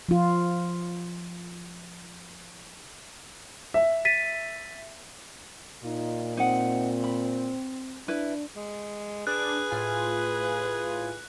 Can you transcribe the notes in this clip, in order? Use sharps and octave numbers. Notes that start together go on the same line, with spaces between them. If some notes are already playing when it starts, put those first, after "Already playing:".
F3 F4
E5
A6 B6 D#7
A#2 D#4 F4
C4 D#4 F#5
B5
D4 E4 B4
G#3
D4 G#4 B4 F#6
A2 F4 G#5